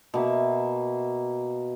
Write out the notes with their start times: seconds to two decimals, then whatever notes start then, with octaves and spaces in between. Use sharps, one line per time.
0.14 B2 A#3 E5